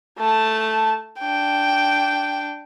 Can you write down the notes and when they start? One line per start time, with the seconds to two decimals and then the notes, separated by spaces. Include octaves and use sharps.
0.18 A3 A5
1.20 D4 G5